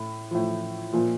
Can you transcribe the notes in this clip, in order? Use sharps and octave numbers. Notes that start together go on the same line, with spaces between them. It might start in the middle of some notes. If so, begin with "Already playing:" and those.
Already playing: A2
A2 F3
A#2 F3